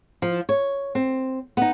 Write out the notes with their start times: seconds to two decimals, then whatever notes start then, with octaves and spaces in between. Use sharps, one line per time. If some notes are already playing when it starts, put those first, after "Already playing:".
0.22 F3
0.49 C#5
0.95 C4
1.57 B3 D#4